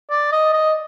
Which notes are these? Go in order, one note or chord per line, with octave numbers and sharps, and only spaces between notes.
D5
D#5
D#5